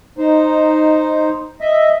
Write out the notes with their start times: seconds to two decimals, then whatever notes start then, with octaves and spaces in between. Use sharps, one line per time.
0.18 D#4 C5
1.61 D#5 E5